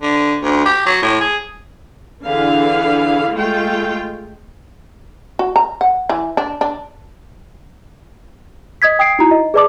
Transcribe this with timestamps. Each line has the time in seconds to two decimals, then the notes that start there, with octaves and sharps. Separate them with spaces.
0.02 D3
0.43 D2
0.65 G4
0.86 F#3
1.02 A2
1.20 G#4
2.25 D3 E3 G#4 B4 F5
3.33 G#3 A3 F4 G5
5.39 F#4
5.56 A#5
5.81 F#5
6.09 E3
6.37 D4
6.61 D4
8.82 D#5 D#6 G#6 B6
8.99 G5 D#6 G#6 C7 D7
9.19 D#4 E4 F#4 A#5
9.31 D#5
9.54 G#4 B4 D5 A5 D6 D#6